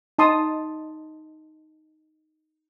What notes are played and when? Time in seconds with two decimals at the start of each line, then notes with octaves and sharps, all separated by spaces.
0.19 D#4 A5 C6 D#6